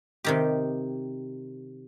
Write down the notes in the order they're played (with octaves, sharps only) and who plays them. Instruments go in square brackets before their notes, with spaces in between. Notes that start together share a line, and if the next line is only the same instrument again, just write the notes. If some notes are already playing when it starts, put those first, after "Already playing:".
[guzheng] C3 D#3 G4